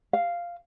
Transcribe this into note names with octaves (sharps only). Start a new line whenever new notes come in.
F5